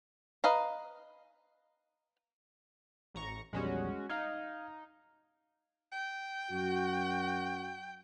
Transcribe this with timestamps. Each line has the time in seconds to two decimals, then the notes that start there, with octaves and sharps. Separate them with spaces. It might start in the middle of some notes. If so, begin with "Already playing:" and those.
0.44 B4 D#5 F5 A#5
3.15 A1 A#5 C#6
3.53 A#1 E2 G3 G#3 C#4 F#4
4.09 D#4 F5 F6 G#6
5.92 G5
6.51 F#2 F#4